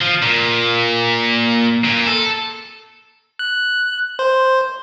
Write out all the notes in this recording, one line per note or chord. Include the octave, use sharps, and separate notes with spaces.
F3
A#2
A#2
A4
F#6
C5